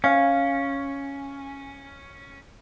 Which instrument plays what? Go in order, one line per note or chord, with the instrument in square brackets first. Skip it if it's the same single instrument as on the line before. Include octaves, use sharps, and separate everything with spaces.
[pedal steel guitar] C#4 [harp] F5